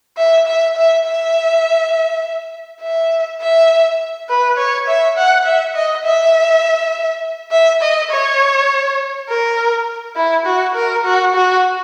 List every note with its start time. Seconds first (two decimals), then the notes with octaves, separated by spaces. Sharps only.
0.17 E5
0.46 E5
0.77 E5
1.05 E5
2.82 E5
3.41 E5
4.29 B4
4.57 C#5
4.87 E5
5.17 F#5
5.46 E5
5.75 D#5
6.05 E5
7.51 E5
7.82 D#5
8.10 C#5
9.28 A#4
10.16 E4
10.46 F#4
10.75 A#4
11.04 F#4
11.35 F#4